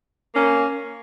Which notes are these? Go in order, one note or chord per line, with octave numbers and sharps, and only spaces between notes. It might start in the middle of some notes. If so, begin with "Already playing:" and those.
A#3 C#4